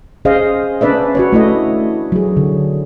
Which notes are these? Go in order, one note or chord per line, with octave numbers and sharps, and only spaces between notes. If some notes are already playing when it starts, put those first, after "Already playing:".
C#4 G#4 C5 D#5 F5
C#4 D4 B4 D5 E5
F#4 B4 C#5
A3 E4 D#5
F#3 G#4
D3